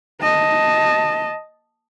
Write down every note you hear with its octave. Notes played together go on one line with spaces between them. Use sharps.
D#5 A5